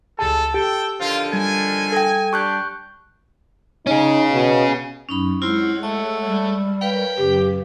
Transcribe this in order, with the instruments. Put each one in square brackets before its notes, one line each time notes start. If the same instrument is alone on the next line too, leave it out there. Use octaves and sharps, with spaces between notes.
[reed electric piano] C#2 A5 [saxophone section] G3 E4 G#4 [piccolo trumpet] A4
[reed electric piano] G4 [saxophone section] A4 [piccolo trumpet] G5
[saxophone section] D3 D#3 F3 [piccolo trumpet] F4
[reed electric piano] G3 [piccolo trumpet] G#5
[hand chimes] A4 G5
[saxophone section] D4 G4 [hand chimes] C#6 F#6 G6
[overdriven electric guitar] C#4 G#4 [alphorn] D#4
[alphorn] B2
[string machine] F#2 [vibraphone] C#4 D#4 B5
[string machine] G#3 C#5 F#5 [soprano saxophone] C4 [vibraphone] E4 F4
[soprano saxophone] A3 [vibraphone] E6
[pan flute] G3
[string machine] A#4 C#5 B5 [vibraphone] B4 F5 [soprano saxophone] G5
[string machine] F#2 C#3 [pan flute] G4